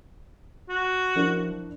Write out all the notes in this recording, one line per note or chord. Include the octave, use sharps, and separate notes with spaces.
F#4
F3 D4 E4 A#4